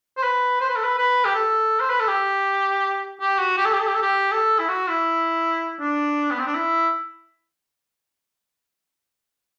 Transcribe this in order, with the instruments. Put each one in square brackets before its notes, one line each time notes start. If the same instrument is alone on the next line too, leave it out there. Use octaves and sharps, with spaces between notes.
[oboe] C5
B4
C5
B4
A4
B4
B4
G4
A4
C5
B4
A4
G4
G4
F#4
G4
A4
G4
A4
G4
A4
G4
A4
E4
F#4
E4
D4
B3
C4
D4
E4